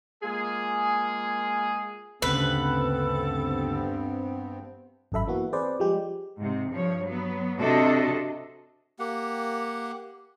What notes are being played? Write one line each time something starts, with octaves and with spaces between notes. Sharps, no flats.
G#3 A#3 F4 G#4
D2 G2 C#3 B3 C4 A4 B4
G#1 F#2 A4 E5 B5
E3 A#3 B3 F#4
C4 G#4 B4 C5 D5
F3 G3 G#3 G4
G#2 C3
G2 F3 C#5
F#3 B3
C3 D4 F#4 A4 D#5
A#3 G4 F#5